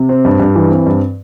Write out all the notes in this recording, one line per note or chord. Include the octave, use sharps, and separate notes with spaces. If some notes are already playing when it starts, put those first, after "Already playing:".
Already playing: C3
C4
G2
G2
E3
C4
G2